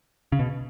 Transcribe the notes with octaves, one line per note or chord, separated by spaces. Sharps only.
C#3
B2